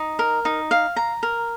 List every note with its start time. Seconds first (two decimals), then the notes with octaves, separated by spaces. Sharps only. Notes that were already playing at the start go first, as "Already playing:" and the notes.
Already playing: D#4
0.19 A#4
0.45 D#4
0.71 F5
0.96 A#5
1.23 A#4